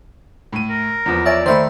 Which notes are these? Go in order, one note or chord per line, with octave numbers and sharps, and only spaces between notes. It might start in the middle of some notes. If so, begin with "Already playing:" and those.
A2 D#7
A#4
E2 F3 B3
C#5 D5 E5 G#5
D#3 A3 C5 E5 B5